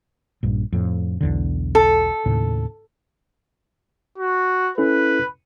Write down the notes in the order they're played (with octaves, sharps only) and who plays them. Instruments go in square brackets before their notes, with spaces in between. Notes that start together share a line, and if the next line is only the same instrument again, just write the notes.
[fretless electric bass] A#1 G2
F2 A2
B1 E2 D3
[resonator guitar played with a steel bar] A4
[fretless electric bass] D#2 A2 C#3
[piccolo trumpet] F#4
[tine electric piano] C#4 E4 A4 [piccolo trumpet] B4